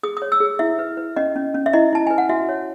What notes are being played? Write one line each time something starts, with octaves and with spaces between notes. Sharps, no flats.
G#4 D#6
D#6
C#5
E6
G#4
E4 E5
B4
B4
C#4 D#5
C#4
C#4
E5
E4 D#5
E4 A5
B4 G#5
F#5
F#4 E5
C#5